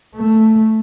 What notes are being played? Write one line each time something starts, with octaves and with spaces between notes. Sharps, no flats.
A3